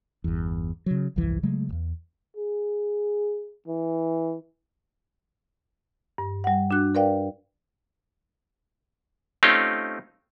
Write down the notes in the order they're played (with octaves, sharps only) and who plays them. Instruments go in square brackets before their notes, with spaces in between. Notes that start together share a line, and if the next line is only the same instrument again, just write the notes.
[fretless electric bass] G1 E2
C#3 F#3
G1 C2 F2 E3
C#3 F#3 G#3 A3
D#1 E2
[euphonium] G#4
E3
[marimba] G2
G3 F#5
D4 F#4 F#6
A#4 B4 D5 F5 G5
[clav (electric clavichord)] A3 C4 C#4 D#4 F4 G4